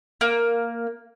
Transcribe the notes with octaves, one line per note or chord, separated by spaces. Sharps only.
A#3